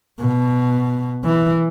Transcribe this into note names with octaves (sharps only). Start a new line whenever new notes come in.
B2
E3